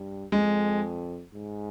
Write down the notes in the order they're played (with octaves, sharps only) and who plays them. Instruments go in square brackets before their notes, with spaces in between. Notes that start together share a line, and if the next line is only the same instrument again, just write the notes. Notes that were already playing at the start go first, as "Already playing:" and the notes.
Already playing: [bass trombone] G2
[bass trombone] F2 [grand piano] G#3
[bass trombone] G#2